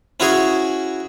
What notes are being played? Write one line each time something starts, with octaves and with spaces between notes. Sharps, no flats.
C#4 E4 F#4 G#4 C#5